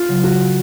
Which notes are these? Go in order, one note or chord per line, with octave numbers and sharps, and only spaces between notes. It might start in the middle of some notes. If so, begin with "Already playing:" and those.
Already playing: F4
C#3 F#3
F#4